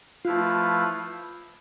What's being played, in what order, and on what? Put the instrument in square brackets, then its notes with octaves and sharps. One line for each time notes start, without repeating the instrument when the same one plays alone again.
[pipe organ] F3 A3 E4 B4 F5 [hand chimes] F4